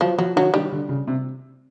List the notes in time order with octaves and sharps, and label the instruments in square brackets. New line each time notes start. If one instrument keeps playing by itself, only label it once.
[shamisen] F3 [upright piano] F#3
[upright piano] F3 [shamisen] F#3
[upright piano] D#3 [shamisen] F#3
[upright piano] D#3 [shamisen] G3
[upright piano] D3
C#3
C3